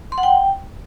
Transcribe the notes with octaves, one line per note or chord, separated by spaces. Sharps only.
C6
F#5
G5